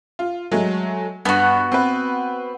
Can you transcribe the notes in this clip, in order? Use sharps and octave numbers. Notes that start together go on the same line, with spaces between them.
F4
F#3 G#3 A3
G2 B3 F#4
C4 B4